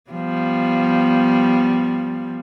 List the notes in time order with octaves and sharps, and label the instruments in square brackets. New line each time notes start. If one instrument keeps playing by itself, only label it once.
[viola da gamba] F3 G3 B3